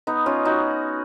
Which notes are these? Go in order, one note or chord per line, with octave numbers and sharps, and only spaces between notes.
B3 D#4
C#4 F4
D#4 F#4